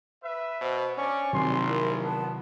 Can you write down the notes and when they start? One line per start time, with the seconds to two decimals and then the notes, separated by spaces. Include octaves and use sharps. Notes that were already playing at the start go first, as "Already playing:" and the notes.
0.23 B4 E5
0.61 B2 C5
0.97 C#4 D4 D5 G#5 C#6
1.33 A#1 C3 D#3 F#3 C6
1.69 E4 A#4
2.03 B3 A5